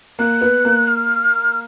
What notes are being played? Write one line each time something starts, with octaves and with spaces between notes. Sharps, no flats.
A#3 F#6
B3
A#3
F6